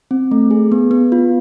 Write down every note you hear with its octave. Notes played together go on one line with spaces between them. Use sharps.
C4
A3
G#4
B3
B3
F4